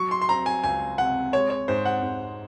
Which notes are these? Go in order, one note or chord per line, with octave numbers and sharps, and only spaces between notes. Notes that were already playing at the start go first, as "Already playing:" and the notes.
Already playing: F#3 C#6
C6
C6
C4 A#5
G#5
C#2 G#5
C3 F#5
G#3 C#5
C#5
G#2 C5
F#5
G#2